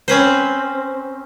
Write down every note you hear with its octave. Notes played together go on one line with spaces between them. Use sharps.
C4 C#4 B4 C5